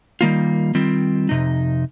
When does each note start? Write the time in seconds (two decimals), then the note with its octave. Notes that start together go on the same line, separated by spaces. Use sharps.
0.21 D#3 G3 A#3 F4
0.75 D#3 G3 C4 F4
1.29 F2 C3 D#4